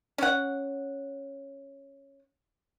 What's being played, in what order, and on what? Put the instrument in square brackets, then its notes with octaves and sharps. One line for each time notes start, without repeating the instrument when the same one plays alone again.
[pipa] C#4 F#5